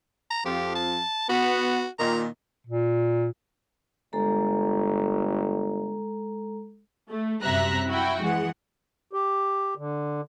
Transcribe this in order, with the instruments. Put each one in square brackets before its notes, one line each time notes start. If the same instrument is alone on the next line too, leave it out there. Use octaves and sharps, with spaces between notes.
[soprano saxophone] A#5
[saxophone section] F2 F3 [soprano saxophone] G4
[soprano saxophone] A5
[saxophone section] B3 [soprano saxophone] F#4
[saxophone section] A#2 D#3 [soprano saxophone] A#5
[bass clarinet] A#2
[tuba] G1 [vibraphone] G#3 A4 A#5
[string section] A3
F#2 C3 G3 E5 A#5 F#6
E4 F#4 G5
E3 G#3 F#5
[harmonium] G4
D3